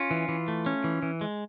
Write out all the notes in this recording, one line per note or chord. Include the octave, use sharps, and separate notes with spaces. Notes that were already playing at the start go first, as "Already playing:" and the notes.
Already playing: C#4 F4
E3
E3
A3
C#4
E3
E3
G#3